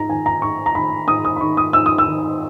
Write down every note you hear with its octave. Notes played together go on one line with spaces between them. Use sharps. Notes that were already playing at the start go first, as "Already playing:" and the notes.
Already playing: G#2 A#5
D#3 G#5
A#5
G#2 C#6
A#5
D#3 B5
G#2 D#6
D#6
B5
D#3 C#6
D#6
G#2 E6
D#6
E6
D#3